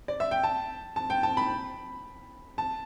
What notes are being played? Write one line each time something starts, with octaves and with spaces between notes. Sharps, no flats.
D5
E5
G5
A5
A5
G5
A5
B5
A5